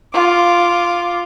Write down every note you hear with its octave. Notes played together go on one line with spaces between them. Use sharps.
F4 D6